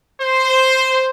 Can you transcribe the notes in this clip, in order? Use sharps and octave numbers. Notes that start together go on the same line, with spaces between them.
C5